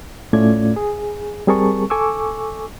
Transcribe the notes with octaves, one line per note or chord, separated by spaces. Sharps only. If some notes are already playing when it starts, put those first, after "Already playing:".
A2 A3 C#4 F4 D5 G#6
G#4
G3 C4 G#4 A#4 A5 C#6
A4 G#5 C#6 D6 E6